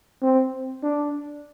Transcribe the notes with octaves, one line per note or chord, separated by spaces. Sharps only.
C4
D4